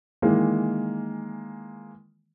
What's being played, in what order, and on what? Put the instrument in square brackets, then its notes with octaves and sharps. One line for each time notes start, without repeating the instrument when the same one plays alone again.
[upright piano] D#3 E3 G#3 A#3